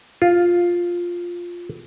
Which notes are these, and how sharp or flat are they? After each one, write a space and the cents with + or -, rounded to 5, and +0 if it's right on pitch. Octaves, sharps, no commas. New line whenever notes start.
F4 +5